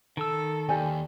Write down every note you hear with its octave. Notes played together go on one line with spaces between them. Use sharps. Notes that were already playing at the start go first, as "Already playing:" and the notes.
D#3 A4 E6
D#2 G4 D5 G#5